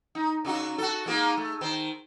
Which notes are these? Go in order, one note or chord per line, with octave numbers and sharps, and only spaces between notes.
D#4
C#3 D#4 F#4
F#4 A4
G#3 A#3 D#4
A3
D#3 C5